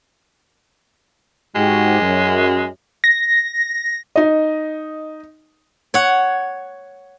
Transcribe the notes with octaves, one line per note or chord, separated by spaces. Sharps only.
G#2 G#3 F#4 G4
F#2
A#6
D#4 D#5
C#5 F#5